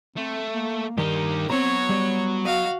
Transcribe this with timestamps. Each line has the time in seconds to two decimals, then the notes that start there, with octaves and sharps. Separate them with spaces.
0.16 A3 C4
0.54 A#3
0.98 G2 D#3 D#4 G4 A#4 A#5
1.50 F#3 B3 C4 C#5 A#5
1.89 G3
2.45 F#4 D#5 F5